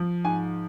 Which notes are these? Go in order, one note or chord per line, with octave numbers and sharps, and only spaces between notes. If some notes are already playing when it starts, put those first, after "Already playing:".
Already playing: F3
G#2 G#5